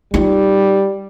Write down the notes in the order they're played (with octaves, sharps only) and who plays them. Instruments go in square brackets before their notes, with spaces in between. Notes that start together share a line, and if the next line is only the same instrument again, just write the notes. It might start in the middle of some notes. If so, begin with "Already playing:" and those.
[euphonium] G3 [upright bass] D#4 F4